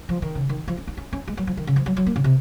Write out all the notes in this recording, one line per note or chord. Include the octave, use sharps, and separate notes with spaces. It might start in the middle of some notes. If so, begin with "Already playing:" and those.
F3
D#3
C#3
D#3
F3
C#4
D#4
C#4
C#4
G#3
F#3
F3
D#3
C#3
F3
F#3
F#3
A#3
C#3
C3